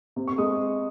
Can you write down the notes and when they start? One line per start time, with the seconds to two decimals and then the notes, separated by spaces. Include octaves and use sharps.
0.16 C3
0.28 C#6
0.38 G#3 D#6